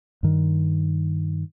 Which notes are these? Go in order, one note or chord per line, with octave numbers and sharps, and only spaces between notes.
G2 D#3